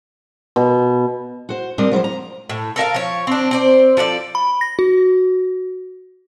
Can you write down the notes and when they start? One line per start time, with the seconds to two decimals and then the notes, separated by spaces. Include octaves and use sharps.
0.56 B2
1.49 F#4 C5
1.78 G3 C4 D4 G4 A#4 D#5
1.91 F3 F#3 A#4 C5
2.04 A#5
2.49 A2
2.76 A4 A#4 E5 F5
2.94 F3 C#5
3.27 C4 D4
3.51 C4 C5 D5
3.97 F3 A4 B4 D5
4.35 B5
4.61 A#6
4.79 F#4